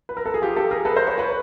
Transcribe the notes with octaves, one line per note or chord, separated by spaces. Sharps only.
B4
A#4
A4
G#4
F4 G4
G4 A4
G#4 A#4
A4 B4
A#4 C5
B4 C#5
B4 C#5